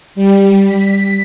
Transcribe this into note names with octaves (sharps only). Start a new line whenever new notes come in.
G3
B6